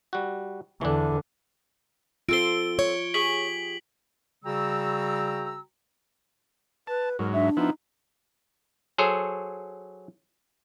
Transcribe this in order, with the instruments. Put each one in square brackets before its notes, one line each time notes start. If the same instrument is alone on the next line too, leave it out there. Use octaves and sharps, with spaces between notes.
[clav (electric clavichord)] G3 F#4
[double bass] E2 D3 [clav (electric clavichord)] E3 D4
[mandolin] C4 A4 C5 [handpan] F4 [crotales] D7 G7
[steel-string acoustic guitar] C#5
[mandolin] G4 G#4 C#6 [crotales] B6 F#7
[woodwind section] C#3 G3 F#4 G5 A#5 E6
[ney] B4 [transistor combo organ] A5
[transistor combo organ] G#2 F#3 [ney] A#4
[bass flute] D4 [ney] E5
[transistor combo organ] F3 B3 E4 [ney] D#4
[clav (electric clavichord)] F#3 G#4 A4 C5 C#5